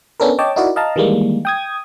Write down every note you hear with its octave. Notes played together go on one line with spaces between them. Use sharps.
B3 C#4 D4 A4 A#4
C#5 D#5 G5 A5 D6
D#4 E4 F#4 A#4 D5
D#5 F5 A5 A#5
D#3 E3 G3 G#3 A#3
G5 D#6 G#6